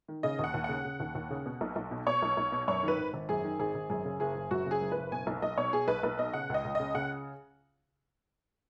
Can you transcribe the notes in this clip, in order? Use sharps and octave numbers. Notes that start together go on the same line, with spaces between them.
D#3
C#3 D#5
D#2 F#5
D#2
C#3 F#5
C#3
D#2
D#2
C#3
B2
B1
B1
B2
B2 C#5
B1
B1
B2
F#2 C#5
D#3
B4
G#1
G#1
F#2 G#4
D#3
G#1 G#4
G#1
F#2 G#4
C#3
F#1 G#4
F#1
F#2 F#4
C#3 G#4
F#1
B4
F#1
B2 G#5
B1
B1 D#5
B2 C#5
B2 G#4
B1 B4
B1 B4
B2 D#5
C#3 F#5
C#2 D#5
C#2
C#3 D#5
C#3 F#5